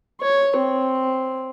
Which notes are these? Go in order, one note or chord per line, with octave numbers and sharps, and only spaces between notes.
C#5
C4